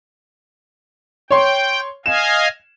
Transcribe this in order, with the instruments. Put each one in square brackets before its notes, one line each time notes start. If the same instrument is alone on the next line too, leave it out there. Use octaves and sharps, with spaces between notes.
[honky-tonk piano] C#5 C6 [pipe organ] G5
[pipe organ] D#5 F5 G#5 [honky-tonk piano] E7